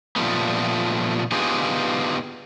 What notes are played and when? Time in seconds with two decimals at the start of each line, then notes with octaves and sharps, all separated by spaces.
0.16 A#2 F3 G3 A3 B3
1.32 B3 D4 D#4 F4 G4 G#4